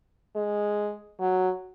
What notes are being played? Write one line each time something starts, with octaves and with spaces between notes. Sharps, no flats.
G#3
F#3